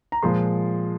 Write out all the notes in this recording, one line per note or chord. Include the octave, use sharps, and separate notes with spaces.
A#5
A#2 F3 G#3 C6